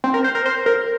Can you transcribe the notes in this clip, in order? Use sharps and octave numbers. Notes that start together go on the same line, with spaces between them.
C4
A#4
C5
A#4
C5
A#4